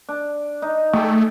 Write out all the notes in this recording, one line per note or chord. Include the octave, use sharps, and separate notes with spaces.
D4
D#4
A3 G#4 G5 D6